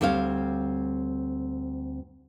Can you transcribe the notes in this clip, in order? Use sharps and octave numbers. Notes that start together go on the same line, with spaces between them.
D2 G3 C4 C#5 F5